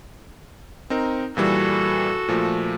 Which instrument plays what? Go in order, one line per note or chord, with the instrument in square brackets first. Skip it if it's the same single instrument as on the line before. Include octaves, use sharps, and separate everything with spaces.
[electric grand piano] C4 D#4 A#4
[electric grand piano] A#2 E3 G3 [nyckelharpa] F#4 A4
[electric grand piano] A#2 F3 A3